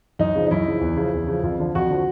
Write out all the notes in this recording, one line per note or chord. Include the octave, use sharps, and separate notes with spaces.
F#2 D#4
C#3 F3
D#4
F#2 E4
C#3 F3
E2
C#3 F3
E2
C#3 F3
F2 F4
D3 F3
F2 F#4
D3 F3